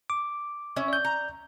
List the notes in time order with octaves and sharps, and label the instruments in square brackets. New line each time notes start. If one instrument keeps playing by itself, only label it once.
[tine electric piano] D6
[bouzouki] C#4 E4
[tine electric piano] D5 G6
[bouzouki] A#5